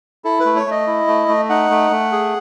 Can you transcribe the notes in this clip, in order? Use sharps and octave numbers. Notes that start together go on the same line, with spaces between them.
E4 A4
B4
A3
C#5
A3 D#5
E4
A3
A3
D#4 F#5
A3
A3
G#4